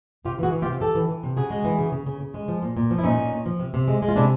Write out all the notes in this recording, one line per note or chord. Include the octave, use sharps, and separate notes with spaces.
C3 F4 G4
E3 F#4 G#4
E3
F4 G4
C3
E3 G4 A4
E3
E3
C3
C#3 F#4 G#4
G#3
E3
C#3
C#3
C#3
C#3
G#3
F3
A#2
A#2
F3
E4
A#2 C#4 D#4
A#2
A#2
F3
C3
C3
G#3
G#3
F4
C3 D4 E4